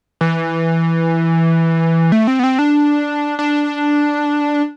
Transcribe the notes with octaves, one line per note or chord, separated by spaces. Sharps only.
E3
A3
C4
B3
C4
D4
D4